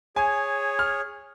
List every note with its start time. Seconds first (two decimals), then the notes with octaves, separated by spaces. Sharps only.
0.16 G#4 C#5 G#5
0.79 F6